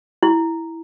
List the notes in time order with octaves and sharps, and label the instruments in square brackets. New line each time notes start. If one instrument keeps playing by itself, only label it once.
[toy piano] E4